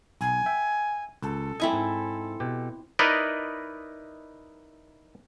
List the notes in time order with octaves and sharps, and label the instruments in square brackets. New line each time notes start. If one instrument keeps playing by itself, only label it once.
[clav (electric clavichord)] B1 [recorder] G#5
[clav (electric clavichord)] E5 G5
[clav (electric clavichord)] C#2 [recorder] A4
[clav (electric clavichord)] A3 D#5 [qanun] C4 E4 G#5
[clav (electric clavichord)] G#2
B2 G4
D#4 E4 A#4 B4 D5 D#5